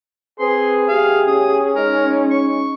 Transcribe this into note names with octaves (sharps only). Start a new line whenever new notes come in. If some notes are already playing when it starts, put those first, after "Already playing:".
C4 G#4 B4 C6
E2 A3 G4 F5
C#4 D#6
G#3 D#4 A#4
C#6